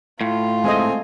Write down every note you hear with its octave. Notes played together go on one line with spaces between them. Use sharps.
A2 F4
G#3 A3 C4 D#5 G#5